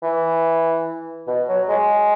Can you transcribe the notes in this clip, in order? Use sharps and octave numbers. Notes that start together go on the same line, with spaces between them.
E3
B2
F#3
G#3